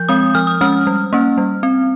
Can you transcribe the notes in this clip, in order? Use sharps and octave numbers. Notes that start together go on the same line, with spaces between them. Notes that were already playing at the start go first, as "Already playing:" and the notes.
Already playing: F3 G6
G#3 C4 D#6
F3 F6
D#6
G#3 C#4 F6
G3
A#3 C#4
G3
C4